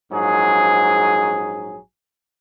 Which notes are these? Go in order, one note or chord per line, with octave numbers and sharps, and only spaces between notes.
A#1 G#2 F#3 G#4